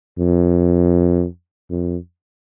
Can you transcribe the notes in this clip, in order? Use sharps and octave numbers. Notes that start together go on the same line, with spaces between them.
F2
F2